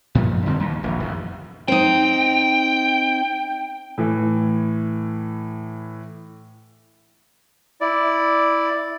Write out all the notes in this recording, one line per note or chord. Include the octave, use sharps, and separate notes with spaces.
F#2 A#2 F3
D3 G3 C4
D#2
D#1 A#1
F1 D#2
C4 D#4 G5
A2 E3
E4 D5